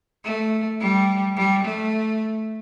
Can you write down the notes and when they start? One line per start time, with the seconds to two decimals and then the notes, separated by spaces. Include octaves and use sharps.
0.24 A3
0.80 G3
1.36 G3
1.64 A3